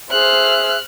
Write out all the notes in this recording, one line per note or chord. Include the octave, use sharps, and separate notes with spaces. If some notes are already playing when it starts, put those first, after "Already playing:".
G#4 C5 E5 F6 F#6